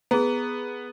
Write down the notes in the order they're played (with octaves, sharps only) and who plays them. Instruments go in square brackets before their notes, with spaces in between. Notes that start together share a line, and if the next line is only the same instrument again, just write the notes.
[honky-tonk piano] B3 [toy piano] G#4 A#5